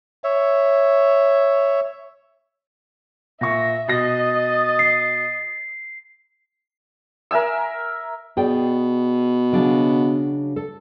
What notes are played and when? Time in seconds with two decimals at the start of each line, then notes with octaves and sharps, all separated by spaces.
0.24 C#5 E5
3.41 A#2 E5 C#6 A#6
3.88 B2 D#5 D#6 A6 A#6
4.79 C7
7.31 A#4 E5 G#5 E6
8.37 B2 G#4 D5 G5
9.52 C#3 F#3 D4
10.56 A4